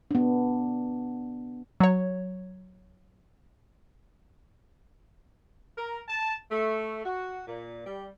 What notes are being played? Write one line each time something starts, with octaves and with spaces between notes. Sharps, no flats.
B3 D4
F#3 C#5
A#4
A5
A3
F#4
A#2
G3